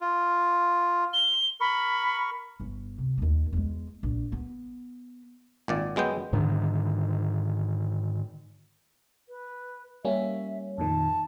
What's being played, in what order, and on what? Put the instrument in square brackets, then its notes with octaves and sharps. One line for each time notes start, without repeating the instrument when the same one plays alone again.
[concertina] F4
[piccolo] G7
[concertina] A#4 C#6 [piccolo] B5
[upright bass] G1
C3
D#2 F3
E2 G#3
A#1
B3
[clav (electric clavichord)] G#1 A#2 D5
F#2 G#3 B3 G5
[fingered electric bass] G#2 D3 D#3
[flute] B4
[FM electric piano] G3 A#3 C#4 [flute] E5
[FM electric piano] F2 A#2 D#3 [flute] A5